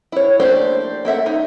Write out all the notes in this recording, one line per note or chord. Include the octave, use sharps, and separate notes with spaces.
E4 C#5
A3 A#3 D4 G4 C5
A#3 A4 E5 F#5
D#4